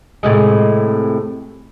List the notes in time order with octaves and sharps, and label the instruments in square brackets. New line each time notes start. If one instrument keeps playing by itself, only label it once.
[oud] A2 C3 G#3